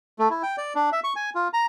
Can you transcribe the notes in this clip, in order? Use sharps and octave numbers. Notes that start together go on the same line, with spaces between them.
A3
E4
G5
D5
D4
E5
C#6
G#5
F4
A#5